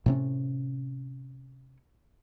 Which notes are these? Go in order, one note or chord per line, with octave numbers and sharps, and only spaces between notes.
A2 C3 C#4